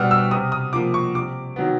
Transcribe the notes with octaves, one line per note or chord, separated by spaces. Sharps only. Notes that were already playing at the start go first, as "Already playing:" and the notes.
Already playing: B2 G3 B3 E6 F6
E6
C3 D#6
D#6
F3 A#3 D6
C#6
C3 D6
D#3 F#3 B3